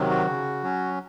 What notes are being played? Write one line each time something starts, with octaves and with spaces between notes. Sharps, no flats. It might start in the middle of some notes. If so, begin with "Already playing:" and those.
Already playing: C3 D#3 F#3
F#4
C#3
F#3 C#4